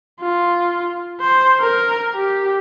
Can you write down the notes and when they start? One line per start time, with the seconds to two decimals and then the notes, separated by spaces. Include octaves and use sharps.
0.20 F4
1.21 C5
1.60 A#4
2.14 G4